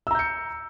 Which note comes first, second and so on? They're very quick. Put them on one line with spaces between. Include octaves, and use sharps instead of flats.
E6 A#5 G6 C#7